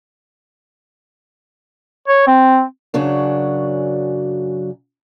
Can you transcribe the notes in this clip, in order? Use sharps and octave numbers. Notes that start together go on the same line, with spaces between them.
C#5
C4
F#2 C#3 F#3 D4